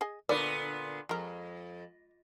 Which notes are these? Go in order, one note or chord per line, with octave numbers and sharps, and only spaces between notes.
G#4 D#5 G#5
A#2 D3 B3 A#4 D5
F2 G#3 A#4